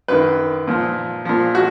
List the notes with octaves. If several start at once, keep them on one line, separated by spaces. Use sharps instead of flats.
F#2 D#3 B4
A#2 F3
A#2 F3
F#4